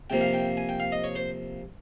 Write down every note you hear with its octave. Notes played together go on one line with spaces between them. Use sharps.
C3 F3 A#3 G5
F5
G5
G#5
G5
F5
D#5
C#5
C5